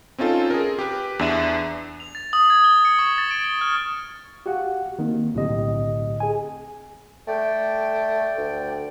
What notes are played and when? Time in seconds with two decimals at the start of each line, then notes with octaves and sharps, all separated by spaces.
0.18 C4 C#4 D#4 F4 A4
0.50 G#4 A#4
0.79 G4 B4
1.19 E2 D4 E5 D#7 E7
2.00 F7
2.15 A6
2.33 D#6
2.50 G#6
2.64 G7
2.85 C#7
2.99 C#6
3.18 A6
3.31 D7
3.44 G7
3.61 F6
4.46 F#4 G4 F5 F#5
4.99 D#3 A#3 C4
5.34 B1 A2 D3 C4 G4 D#5
6.20 G#4 G#5
7.27 A3 D5 G5
8.37 D2